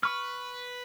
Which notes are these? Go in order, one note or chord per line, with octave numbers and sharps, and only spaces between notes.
B4 C#6 F6